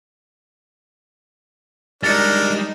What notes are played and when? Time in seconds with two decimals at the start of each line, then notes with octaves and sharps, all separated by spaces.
2.03 G3 G#3 D4 D#4 A#4 A6 C#7